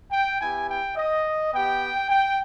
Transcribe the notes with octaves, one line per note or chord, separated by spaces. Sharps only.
G5
B3 E4 G4 G#5
G5
D#5
B3 G4 G5
G5